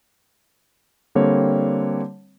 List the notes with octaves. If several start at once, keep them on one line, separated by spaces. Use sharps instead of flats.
D3 G3 A#3 C4 C#5